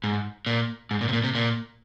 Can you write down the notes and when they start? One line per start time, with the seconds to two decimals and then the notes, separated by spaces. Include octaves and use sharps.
0.04 G#2
0.46 A#2
0.91 G#2
1.01 A#2
1.09 C3
1.13 A#2
1.24 C3
1.35 A#2